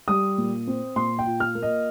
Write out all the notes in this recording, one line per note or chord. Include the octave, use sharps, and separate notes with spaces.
G3 D#6
A#2
C4
A#2 C6
G5
F4
F6
A#3
D#5